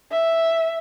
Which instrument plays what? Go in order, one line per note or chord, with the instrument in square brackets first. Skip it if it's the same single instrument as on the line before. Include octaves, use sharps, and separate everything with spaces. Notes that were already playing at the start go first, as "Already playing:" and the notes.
[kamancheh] E5